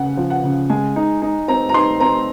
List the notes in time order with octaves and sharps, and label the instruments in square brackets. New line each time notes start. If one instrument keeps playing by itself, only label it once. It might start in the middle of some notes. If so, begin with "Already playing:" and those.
Already playing: [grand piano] C#3 [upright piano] F#5
[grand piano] F3
[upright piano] F#5
[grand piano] C#3
[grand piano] G#3 [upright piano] G#5
[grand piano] D#4
D#4
[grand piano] C4 [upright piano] A#5
[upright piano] A#5
[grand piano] D#4 [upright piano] C6
[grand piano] C4 [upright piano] A#5